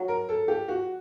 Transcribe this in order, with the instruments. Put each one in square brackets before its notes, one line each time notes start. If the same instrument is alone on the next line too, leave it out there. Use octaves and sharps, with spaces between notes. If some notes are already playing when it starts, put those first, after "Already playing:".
Already playing: [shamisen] F#3
[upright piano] A#4
A4
G4
F#4